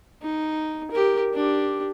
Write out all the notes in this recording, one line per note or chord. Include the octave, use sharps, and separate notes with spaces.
D#4
G4 A#4
D4 G4